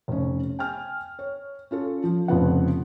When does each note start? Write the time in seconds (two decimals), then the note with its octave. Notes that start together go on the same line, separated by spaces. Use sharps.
0.08 F1 C#4
0.59 G5 G#5 F6
1.19 C#5
1.71 C#4 F4 A4
2.04 F3
2.28 F1 F2 C#3 F3 B3 F#5